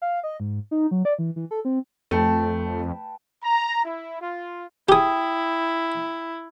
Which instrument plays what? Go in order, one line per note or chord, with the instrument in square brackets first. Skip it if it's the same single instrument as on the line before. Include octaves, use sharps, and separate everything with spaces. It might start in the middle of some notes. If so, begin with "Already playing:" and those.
[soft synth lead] F5
D#5
G#2
D#4
F#3
D5
E3
E3
A4
C4
[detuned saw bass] F2 [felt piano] A3 [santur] B4 G5 A5
[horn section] A#5
E4
F4
[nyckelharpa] E4 [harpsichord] G4 G#4 [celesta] G5 D#6